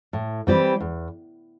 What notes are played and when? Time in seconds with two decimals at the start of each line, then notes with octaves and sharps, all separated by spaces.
0.13 A2
0.47 E3 G3 C4 G4
0.80 E2